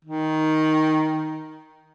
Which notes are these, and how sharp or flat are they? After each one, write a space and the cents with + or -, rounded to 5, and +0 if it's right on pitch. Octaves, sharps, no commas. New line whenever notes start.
D#3 +5